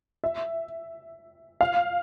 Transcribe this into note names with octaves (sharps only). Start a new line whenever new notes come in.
E5
F5